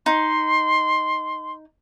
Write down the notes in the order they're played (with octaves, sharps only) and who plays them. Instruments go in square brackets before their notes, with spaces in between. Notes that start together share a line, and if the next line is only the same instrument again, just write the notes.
[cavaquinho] D#4 [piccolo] C6